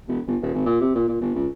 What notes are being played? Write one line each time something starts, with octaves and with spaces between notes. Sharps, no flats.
E1
G1
D#1
G#1
A#2
C3
A#2
A#2
G1
C#2